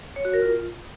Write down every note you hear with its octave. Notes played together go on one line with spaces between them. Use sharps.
C#5
F#4
A#4
F4